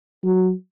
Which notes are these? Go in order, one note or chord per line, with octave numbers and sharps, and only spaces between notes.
F#3